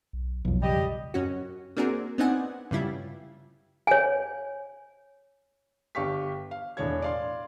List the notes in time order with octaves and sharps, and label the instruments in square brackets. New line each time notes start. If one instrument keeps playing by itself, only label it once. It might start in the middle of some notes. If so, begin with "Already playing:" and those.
[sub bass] B1
[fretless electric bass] B1 F2 [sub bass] F#3
[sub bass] C#3 [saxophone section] G3 G4 D#5
[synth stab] F#2 C#4 F#4
A#3 C4 D4 F#4 G#4 A#4
B3 C4 D4 D#4 F#5 G#5
G2 C#3 G3 E4 F4
[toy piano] C#5 G#5
[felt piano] G1 G4 F5 G5 C#6 B6
F5
E1 A2 D4 C#5 G#6
D5 F5 C6